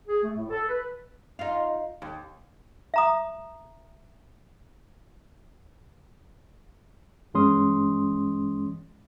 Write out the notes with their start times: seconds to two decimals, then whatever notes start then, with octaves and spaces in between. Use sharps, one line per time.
0.08 G#4
0.23 A3
0.36 A2
0.50 A4
0.67 B4
1.39 D#4 F4
2.02 D#2
2.94 E5 A#5 D#6
7.34 G2 E3 G#3 C#4 C6 D#6